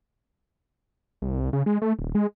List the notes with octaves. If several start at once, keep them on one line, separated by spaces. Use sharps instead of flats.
C2
C2
C#3
G#3
A3
D#1
G#3